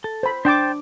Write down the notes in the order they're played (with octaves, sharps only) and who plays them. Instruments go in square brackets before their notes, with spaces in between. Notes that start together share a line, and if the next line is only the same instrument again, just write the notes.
[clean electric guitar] A4
[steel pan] C5 B5
[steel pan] D4 D6 [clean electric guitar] C5 G5 A5